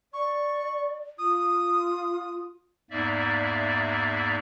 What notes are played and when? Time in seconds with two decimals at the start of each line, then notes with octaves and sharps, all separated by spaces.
0.13 D5 C#6
1.19 F4 D#6
2.91 E2 G#2 A#3 D5 E5